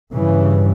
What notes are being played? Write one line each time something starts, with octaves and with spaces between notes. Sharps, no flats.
G2 C#3 E3